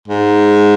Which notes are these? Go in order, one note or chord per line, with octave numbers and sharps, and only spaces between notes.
G#2